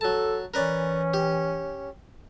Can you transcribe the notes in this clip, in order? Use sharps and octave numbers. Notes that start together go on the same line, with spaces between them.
F#3 A4 A5
E3 C#4 A#4 B4 D5
G4